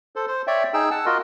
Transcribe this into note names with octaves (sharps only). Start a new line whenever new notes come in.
A4 C5
C5
C#5 D5 E5 G5
D#4 G#4 G5 E6
F#5 A5 E6
F4 F#4 A#4 D#5